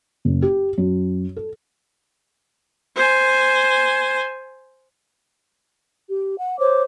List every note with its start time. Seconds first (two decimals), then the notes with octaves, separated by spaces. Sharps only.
0.25 F#1
0.42 G4
0.78 F#2
1.36 A4
2.96 C5 G#5
6.08 G4
6.38 F#5
6.59 C5 C#5 D6